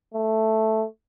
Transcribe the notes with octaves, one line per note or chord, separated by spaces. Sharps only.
A3